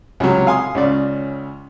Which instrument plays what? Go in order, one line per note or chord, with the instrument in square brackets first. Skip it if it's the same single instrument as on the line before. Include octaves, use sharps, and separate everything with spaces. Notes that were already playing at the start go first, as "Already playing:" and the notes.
[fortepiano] C#2 C3 F#3
F5 G#5 C6 D#6
C#2 C#3 D5